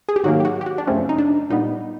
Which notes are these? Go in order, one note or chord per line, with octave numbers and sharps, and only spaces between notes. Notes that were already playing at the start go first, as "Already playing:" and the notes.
G#4
G4
G#2 D#3 F#3 A#3 F#4
G4
F#4
G4
F#4
D4
F#2 C#3 F3 A3 C4 C#4
D#4
D4
A#2 G3 B3 D#4